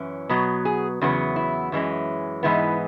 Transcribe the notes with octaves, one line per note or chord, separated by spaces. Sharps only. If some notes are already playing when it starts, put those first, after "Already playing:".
Already playing: F#2 E3 C#4
B2 F#3 B3
G#4
E2 C#3 F#3 B3
E4
F#2 E3 G#3 C#4
G#2 E3 G#3 B3 E4